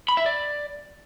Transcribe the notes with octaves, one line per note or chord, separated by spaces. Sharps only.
B5
E5
D5